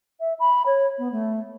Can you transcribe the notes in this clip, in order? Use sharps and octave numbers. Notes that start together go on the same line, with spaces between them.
E5
B5
C#5
B3
A3